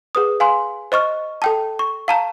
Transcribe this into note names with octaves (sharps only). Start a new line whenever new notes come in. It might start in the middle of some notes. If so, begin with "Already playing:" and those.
G#4 B4 D#6
F5 G#5 C6
C5 D#5 C#6 F6
A4 G5 A5
C#6
F5 A5 A#5